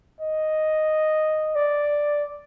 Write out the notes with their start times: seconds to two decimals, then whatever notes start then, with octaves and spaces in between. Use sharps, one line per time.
0.21 D#5
1.56 D5